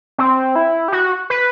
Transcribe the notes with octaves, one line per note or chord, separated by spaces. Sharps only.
C4
E4
G4
F#4
B4